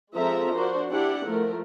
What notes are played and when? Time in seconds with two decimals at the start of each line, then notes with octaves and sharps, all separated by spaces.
0.14 F3 G#3 C4 A4 E5 A#5
0.54 D4 F#4 A#4 C5
0.90 D4 E4 G4 F#5
1.26 F3 A3 A#4